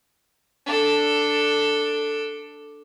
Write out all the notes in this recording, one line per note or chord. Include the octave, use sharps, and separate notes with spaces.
D4 A4